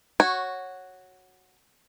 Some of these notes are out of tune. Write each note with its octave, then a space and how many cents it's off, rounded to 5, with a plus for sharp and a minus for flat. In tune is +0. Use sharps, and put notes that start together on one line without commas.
F#4 +0 C#5 -10